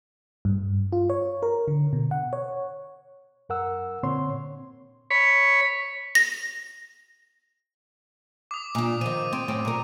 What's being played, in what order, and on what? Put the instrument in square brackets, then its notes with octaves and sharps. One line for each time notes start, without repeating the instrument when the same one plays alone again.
[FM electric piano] G2
F4
C#5
A#4
D3
B2
F#5
C#5
[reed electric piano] F#2 A#4 F#5 E6
A#2 D3 C4 C#5 C6
[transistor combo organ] C#5 B5
[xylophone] A#6
[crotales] D6 D#6
[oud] A#2 D4
[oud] D#3 F3 [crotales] D#7
[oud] C4
F#2 A2 C4
A#2 A#4